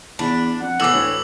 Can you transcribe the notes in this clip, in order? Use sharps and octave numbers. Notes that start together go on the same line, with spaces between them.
E2 D4 B5
F2 F#5
E2 A2 E3 D6 E6 F#7
D2 C#5